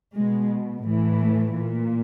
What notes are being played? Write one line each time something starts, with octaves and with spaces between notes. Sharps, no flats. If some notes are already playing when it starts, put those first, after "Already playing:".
B2 G#3
A2 E3
A3
A#2